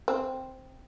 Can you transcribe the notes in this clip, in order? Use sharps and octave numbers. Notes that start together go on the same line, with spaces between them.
C4